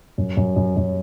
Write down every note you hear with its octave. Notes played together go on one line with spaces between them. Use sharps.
F#2
F#2
F#2
F#2